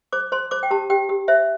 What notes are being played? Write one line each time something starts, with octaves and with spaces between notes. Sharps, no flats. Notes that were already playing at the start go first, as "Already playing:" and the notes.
C5 D6
C5 C6
C5 D6
G5
G4 A5
G4 G5
G4
C5 E5